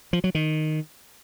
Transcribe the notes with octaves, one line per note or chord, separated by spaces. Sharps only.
F3
F#3
D#3